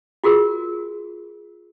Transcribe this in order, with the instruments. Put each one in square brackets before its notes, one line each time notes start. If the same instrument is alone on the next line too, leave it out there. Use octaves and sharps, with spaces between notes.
[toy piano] F4 F#4 G#4 A#4